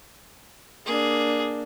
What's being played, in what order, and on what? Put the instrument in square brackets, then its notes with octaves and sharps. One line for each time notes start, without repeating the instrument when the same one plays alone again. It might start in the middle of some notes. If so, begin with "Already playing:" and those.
[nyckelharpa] A#3 D4 [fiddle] G#4